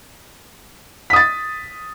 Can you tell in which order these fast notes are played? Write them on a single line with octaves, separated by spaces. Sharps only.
B6 D#6 A6